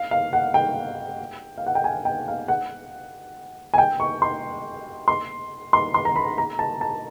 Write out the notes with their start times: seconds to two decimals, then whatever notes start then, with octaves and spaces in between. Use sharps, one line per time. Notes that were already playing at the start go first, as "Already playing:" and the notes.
Already playing: F5
0.11 F5
0.33 F#5
0.54 G5
1.58 F5
1.66 F#5
1.75 G5
1.84 G#5
2.05 G5
2.28 F5
2.48 F#5
3.74 G#5
3.78 G5
4.00 C#6
4.22 C6
5.08 C6
5.73 C6
5.94 C6
6.05 A#5
6.16 B5
6.38 A#5
6.59 A5
6.81 A5